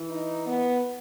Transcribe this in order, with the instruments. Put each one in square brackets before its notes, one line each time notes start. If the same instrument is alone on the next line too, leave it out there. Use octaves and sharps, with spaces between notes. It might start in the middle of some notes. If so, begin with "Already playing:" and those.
Already playing: [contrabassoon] E3
[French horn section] D#4
B3